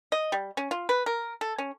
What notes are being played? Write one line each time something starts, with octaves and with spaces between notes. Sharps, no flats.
D#5
G3
C#4
F4
B4
A#4
A4
C#4